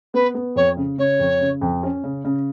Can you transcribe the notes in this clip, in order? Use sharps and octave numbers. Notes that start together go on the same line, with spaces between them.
B3 B4
B3
F2 C#5
C#3
C#3 C#5
F2
C#3
F2
C#4
C#3
C#3